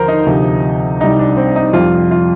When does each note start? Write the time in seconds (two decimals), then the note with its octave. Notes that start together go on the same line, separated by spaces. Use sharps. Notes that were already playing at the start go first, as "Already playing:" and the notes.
Already playing: D#2 D3 F3 A#4 C5
0.08 D#4
0.26 D2 C3 F3
1.00 C2 C3 G3 D#4
1.19 D4
1.37 C4
1.56 D#4
1.73 F2 C3 G3 F4
2.11 F4